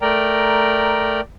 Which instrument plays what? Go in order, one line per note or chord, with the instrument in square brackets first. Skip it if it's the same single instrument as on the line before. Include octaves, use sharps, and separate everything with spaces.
[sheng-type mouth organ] A3 A#4 D5 G5 A#5